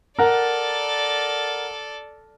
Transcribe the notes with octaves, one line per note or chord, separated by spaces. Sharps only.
A4 A#4 D5 F#5